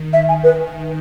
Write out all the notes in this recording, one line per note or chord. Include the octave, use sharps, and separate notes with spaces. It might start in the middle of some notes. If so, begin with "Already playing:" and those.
Already playing: D#3
E5
G#5
B4